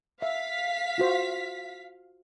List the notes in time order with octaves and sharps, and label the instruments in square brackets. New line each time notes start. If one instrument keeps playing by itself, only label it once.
[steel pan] E5 [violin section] F5 B6
[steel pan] F4 F#4 C5